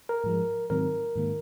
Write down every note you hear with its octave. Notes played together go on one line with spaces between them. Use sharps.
A#4
G#2 F3 G#3
G#2 D#3 F#3 C4 A#4
G#2 D#3 A#3